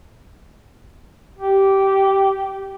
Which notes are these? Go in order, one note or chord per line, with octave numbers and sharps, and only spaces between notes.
G4